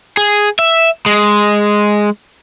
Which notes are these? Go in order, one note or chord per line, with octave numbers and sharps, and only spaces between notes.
G#4
E5
G#3